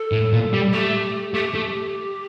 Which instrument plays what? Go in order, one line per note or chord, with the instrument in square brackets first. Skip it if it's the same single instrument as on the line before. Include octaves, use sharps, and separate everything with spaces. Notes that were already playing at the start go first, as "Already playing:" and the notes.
Already playing: [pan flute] A4
[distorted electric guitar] A2
A#2
G3
[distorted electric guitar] A3 [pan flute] G4
[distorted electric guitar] A3 [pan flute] G4
[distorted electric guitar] A3